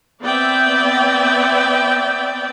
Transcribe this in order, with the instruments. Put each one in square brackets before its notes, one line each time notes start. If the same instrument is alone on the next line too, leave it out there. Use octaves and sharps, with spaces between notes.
[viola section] B3 C4 D5 E5 G5